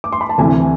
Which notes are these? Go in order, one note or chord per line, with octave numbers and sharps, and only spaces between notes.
D6
C6
B5
A5
D2 C3 E3 G#5